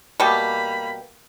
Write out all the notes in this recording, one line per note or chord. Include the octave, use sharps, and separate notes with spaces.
B2 G3 A#3 G4 B5